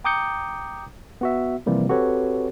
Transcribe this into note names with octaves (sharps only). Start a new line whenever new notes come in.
G5 A#5 D6 D#6 G6 C#7
B3 F#4 E5
C3 E3 F3 G3 A#3
C4 F#4 G4 A4 B4 C#5